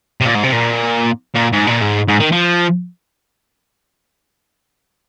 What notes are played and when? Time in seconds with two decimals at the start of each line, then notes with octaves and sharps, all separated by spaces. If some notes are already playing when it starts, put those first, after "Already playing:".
0.21 C3
0.25 A#2
0.35 G#2
0.44 C3
0.53 A#2
1.35 A#2
1.53 G#2
1.67 A#2
1.82 G#2
2.08 G#2
2.20 D#3
2.32 F3